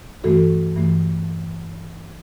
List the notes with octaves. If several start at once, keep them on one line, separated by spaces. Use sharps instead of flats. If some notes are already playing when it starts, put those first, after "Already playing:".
G2 E3 A3 F#4 A4
G2 E3 A3